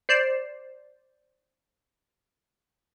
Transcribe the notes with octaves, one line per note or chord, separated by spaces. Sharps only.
C5 D5 C7 E7